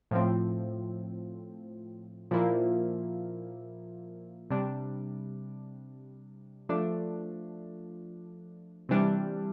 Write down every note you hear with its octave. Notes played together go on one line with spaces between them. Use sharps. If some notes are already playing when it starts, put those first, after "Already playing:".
A2 F3 C4
A#2 F3 A#3 E4
C3 G3 D4
F3 A3 D4
C3 E3 G3 D4